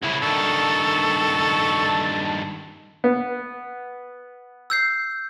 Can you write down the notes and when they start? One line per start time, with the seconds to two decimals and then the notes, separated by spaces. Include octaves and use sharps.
0.03 C2 C#3 E4
0.22 G2 D#3 A4 C#6
1.84 A5
3.04 B3
4.70 E6 G6 C7